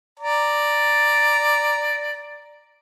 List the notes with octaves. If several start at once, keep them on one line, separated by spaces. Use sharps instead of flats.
D5 A#5